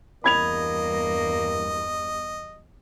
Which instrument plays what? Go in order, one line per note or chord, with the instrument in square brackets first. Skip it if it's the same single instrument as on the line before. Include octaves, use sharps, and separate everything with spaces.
[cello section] E2 G2 [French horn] A#3 [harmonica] D#5 [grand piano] B5 G#6 F7